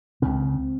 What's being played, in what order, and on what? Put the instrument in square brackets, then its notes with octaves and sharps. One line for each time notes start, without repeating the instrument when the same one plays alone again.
[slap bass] C#2 C#3 C4